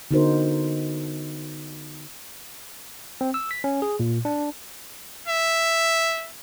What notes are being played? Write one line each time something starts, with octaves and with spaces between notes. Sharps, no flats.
D3 B3 D#4 F#4 A#4 C5
C4
E6
B6
C#4
G#4
A#2
D4
E5